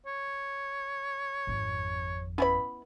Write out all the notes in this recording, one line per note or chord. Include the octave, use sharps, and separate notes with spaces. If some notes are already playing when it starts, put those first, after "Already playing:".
C#5
G#1 F2
B3 C#4 E4 B4 B5